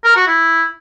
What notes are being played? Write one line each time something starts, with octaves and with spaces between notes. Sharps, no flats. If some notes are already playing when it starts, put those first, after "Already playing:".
A#4
F#4
E4